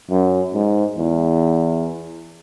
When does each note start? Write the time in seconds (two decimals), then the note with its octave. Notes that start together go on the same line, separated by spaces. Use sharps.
0.10 F#2
0.54 G#2
0.97 E2